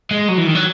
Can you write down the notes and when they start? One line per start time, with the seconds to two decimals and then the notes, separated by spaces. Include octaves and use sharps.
0.11 G#3
0.29 F#3
0.38 E3
0.46 D#3
0.55 F#3